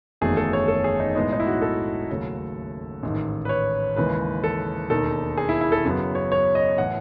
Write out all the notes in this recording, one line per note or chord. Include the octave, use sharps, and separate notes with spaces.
F#1 E2 D#3 F#3 A3 G#4
A4
C#5
A4
G#4
D#4
B1 A2 G#3 B3 D#4
D#4
E4
F#4
A4
D#2 C#3 F#3 A3
A1 G#2 D#3
B4
C#5
D#2 C#3 E3 G#3 B4
A4
E1 D#2 D#3 A4
G#4
E4
E4
A4
F#2 C#3 F#3 B3
C#5
C#5
D#5
A2 E3 F#5